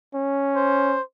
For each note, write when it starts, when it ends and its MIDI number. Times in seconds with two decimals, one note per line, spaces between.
0.15 0.97 61
0.56 1.02 72